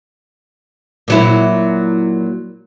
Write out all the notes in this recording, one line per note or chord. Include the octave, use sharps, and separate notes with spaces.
A#2 F#3 E4